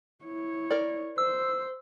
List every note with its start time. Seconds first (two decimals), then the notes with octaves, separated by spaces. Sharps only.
0.24 E4 C#5
0.71 A#4 D5
1.18 C5 E6